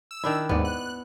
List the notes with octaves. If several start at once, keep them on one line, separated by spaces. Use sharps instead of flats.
E6
D#3 D4 E4
D#2 G#2 B3 D5
F#6